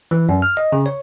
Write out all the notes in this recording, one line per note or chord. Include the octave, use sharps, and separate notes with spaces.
E3
F#2
F6
D#5
C#3
C#5